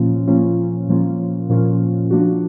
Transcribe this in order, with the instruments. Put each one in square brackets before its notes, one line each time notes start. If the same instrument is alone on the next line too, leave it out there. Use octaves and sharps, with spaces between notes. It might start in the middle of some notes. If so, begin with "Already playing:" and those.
Already playing: [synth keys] A#2 F3 A#3 C#4 F4
A#2 F3 A#3 C#4 F4
A#2 F3 A#3 C#4 F4
A#2 F3 A#3 C#4 F4
F3 A#3 D4 F#4